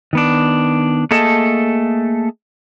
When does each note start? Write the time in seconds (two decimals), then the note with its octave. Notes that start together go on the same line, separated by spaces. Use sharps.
0.13 D#3 B3 D4
1.11 A3 A#3 G#4 A4 D#5 A5